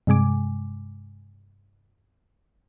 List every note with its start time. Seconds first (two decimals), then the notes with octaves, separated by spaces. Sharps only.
0.07 G2 C3 G#3 G#5 D6